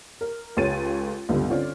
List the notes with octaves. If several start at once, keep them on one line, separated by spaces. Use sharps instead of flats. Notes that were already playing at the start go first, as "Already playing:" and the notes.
A#4
C#2 G4 A4 C#5 A6 D#7
C#2 G2 D3 G3 B3
D3 C4 C#4 F4 C#5 D5